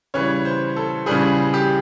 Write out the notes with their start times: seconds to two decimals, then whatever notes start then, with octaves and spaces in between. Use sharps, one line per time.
0.14 C#3 E3 G3 C#5
0.45 C5
0.76 A4
1.06 C#3 E3 G3 G#4
1.54 G4